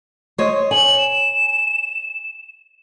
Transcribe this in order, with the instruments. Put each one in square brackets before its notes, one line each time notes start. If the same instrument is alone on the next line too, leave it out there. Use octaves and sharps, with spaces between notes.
[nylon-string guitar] C5 C#5 D#5
[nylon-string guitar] C#5 G#5 [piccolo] F#7
[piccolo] E7